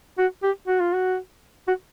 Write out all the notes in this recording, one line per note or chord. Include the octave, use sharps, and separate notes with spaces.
F#4
G4
F#4
F4
F#4
F#4